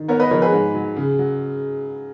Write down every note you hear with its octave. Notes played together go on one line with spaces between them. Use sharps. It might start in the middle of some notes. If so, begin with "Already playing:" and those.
Already playing: D#3
B3 A#4 C#5
B4 D#5
F3 A#4 C#5
G#4 B4
G#2
F#3
C#3
F#3